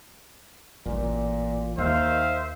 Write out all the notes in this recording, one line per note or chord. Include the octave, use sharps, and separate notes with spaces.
A1 A#2 E3
D#2 D#3 C5 E5 F5